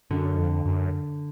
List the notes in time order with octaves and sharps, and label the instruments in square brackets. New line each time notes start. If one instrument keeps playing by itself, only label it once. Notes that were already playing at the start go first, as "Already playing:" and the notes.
[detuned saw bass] F#2 [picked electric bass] D3
[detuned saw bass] F2
F#2